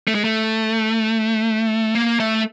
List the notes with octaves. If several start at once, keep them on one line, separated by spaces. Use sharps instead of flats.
A3
G#3
A3
A#3
A3